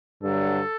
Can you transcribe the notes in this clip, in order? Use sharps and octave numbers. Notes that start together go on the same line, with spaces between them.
G2 D3 F#3 A4